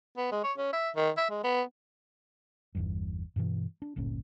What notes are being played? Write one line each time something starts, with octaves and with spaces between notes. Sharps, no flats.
B3
G#3
C#5
C#4
E5
D#3
E5
G#3
B3
G1 E2 G2
G2 B2 D3 E3
D4
D1 G1 A#2 C#4